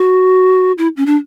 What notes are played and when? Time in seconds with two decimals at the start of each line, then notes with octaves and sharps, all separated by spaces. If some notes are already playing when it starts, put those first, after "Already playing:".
Already playing: F#4
0.78 E4
0.97 C#4
1.06 D4